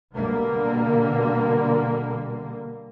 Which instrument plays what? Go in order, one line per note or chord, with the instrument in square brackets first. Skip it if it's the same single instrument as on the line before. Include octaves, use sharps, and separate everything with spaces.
[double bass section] B2 D3 G3 A#3